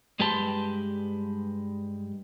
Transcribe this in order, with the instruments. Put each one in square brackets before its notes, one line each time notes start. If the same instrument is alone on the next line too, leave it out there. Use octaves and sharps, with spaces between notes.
[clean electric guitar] G2 G#3 G4 B4 A5 C6